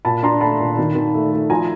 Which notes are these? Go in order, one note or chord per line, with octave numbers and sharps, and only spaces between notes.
A#2 A5 B5
D4 A#5 C6
A3 A5 B5
A#2
D#3
D#3
A3
A3
F3 G#5 A#5